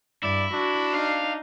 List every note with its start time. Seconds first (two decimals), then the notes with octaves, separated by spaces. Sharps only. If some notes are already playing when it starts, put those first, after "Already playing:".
0.23 G2 E4 D5
0.53 D4 F#4
0.95 D#4 F5